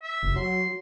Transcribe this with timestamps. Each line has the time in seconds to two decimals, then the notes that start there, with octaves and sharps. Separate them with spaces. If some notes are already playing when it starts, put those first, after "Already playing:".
0.03 E5
0.23 F#1
0.36 F#3 C6